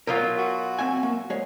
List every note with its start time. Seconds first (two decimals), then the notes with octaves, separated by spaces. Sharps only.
0.07 B2 F#3 F4 A#4 F5
0.39 F#4
0.79 C4 E5 G#5
1.03 A#3
1.30 G#3 G#4 C#5